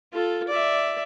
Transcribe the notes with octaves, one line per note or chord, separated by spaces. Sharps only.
F4 A4
D5 E5